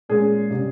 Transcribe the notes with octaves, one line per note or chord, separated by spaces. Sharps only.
A#2 G#3 C#4 G#4
C3 G3 C#4